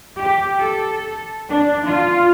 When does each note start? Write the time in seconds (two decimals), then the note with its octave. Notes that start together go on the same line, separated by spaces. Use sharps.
0.19 G4
0.58 A4
1.49 D4
1.86 F4